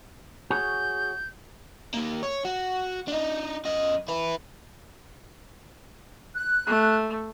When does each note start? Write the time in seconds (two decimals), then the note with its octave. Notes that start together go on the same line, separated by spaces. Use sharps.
0.50 F#4 G#4 C#5 G6
1.94 D#3 A#3
2.23 C#5
2.45 F#4
3.08 D4 D#4
3.65 F#2 D#5
4.08 E4 B4
6.34 F#6
6.67 A3